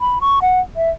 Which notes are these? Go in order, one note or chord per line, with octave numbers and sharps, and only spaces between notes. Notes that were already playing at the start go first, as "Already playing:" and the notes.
B5
C#6
F#5
E5